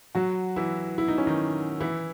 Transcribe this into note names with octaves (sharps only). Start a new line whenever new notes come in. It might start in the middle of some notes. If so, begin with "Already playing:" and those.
F#3 F#4
E3 E4
E4
D#4
C#4
D#3 D#4
E3 E4